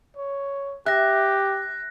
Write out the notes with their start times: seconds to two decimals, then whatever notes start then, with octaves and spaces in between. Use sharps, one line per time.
0.17 C#5
0.86 G4 E5 F#6 A#6